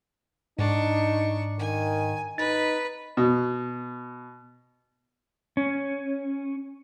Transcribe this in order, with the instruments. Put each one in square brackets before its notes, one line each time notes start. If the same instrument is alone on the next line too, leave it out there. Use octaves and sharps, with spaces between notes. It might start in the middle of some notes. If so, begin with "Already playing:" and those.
[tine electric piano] G#2 [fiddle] D4 C#6 [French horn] D#4
[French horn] D#3 [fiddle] G#5
[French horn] D#4 [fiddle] B4 [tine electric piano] A6
[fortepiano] B2
[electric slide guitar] C#4